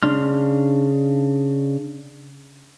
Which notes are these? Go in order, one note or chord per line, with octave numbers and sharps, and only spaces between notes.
C#3 D4 C6 F6